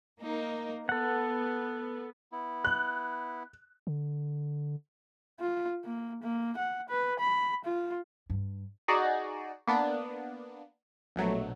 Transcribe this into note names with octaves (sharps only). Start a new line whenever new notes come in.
A#3 D#4 A#4
B3 A4 F#5
B3 E4
F#6
D3
F4
A#3
A#3
F#5
B4
B5
F4
G2
D#4 F#4 G#4 D5
A#3 B3 D4
A#1 B2 F#3 A3